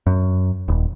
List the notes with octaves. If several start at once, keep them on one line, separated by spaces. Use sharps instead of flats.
F#2
D#1